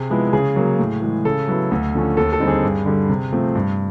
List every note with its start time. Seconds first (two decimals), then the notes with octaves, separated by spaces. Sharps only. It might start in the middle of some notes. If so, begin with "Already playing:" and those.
Already playing: C3 G#4
0.10 F3 G#3 B3 E4
0.33 C#3 G#4
0.56 F#3 A#3
0.79 A2
1.02 E3 G#3
1.25 C#3 A4
1.48 F#3 B3 E4
1.71 D2
1.94 D3 F3 A3 C#4
2.17 D#2 A4
2.33 A4
2.40 D3 G3 C4 D#4
2.48 G#4
2.63 G2
2.86 D3 G3
3.09 C3
3.32 F3 A3 C4
3.55 G2